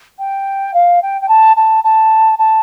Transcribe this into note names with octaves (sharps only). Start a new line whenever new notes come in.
G5
F5
G5
G5
A5
A5
A5
A5